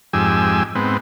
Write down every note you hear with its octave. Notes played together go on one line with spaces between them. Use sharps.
F2 G#2 G4 G#5 E6
G#2 B3 C4